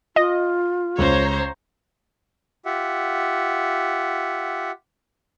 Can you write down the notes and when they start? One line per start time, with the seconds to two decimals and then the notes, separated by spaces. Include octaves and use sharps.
0.16 F4 D#5
0.98 C#2 C5 C#5 A#5
2.65 F4 G4 E5 F#5